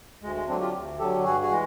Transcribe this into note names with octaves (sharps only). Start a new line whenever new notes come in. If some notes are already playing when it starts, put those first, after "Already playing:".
D2 G#3
G#3
D3 F#3 C4 D4
F4 G4
D2
D3 F#3 G4 A4
G2 F#4 G#4
F#4 G#4
E3 G#3